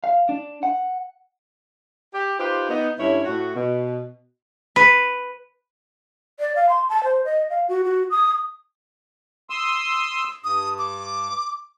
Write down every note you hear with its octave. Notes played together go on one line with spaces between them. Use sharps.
F5
D4
F#5
G4
D#4 F4 G4 B4 C5
B3 D#4
G2 D3 C#4 E4 C#5
A2 F#4
B2
B4
D5
F5
C6
A5
C5
D#5
F5
F#4
F#4
D#6
C6 D#6 E6
G2 D#6
D6